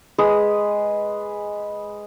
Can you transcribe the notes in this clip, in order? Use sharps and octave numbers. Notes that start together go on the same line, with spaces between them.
G#3 G#4 B4 D#6